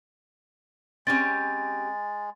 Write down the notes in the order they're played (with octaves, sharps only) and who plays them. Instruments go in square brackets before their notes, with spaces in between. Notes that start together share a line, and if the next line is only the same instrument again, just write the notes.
[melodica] G#3 [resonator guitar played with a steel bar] C4 C#4 G4 [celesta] A6